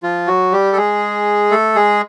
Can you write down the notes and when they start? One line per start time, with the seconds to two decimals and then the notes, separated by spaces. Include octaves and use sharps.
0.03 F3 F4
0.27 F#3 F#4
0.52 G3 G4
0.72 A4
0.77 G#3 G#4
1.51 A3 A4
1.76 G#3 G#4